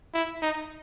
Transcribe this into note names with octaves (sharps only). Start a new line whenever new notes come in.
E4
D#4